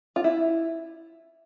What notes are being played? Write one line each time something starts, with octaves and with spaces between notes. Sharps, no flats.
F4
E4